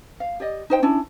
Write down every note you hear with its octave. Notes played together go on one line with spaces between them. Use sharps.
F5
G4 D5 D#5
D#4 C5 G5
C#4 D4 E4